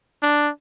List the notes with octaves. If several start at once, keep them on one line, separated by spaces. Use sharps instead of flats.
D4